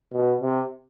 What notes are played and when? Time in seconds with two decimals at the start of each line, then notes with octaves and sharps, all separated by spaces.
0.13 B2
0.41 C3